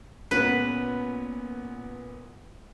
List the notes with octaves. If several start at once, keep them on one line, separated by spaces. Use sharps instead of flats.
A#2 B3 C#4 B4